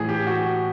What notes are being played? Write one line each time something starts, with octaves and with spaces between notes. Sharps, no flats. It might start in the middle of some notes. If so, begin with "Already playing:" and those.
Already playing: A2 E3 G#4
G4
F#4